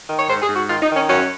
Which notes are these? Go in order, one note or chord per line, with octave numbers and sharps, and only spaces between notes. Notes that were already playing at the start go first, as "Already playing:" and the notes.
D#3
C#5
G#2 C5
G#4
G#2
F#4
D#3 F4
D#4
D#3
C#4
F#2 C#4